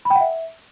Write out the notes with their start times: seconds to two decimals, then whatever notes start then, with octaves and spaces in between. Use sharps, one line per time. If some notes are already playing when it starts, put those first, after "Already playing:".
0.05 B5
0.10 G5
0.15 F#5
0.21 E5